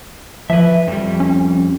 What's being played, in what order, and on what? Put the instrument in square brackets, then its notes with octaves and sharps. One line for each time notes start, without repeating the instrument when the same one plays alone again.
[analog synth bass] F3 [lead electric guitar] B4 E5
[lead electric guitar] F2 G3
[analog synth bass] C#4